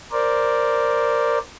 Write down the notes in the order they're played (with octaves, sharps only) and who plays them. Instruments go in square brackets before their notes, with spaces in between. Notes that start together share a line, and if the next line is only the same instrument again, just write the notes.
[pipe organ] A#4 C5 D5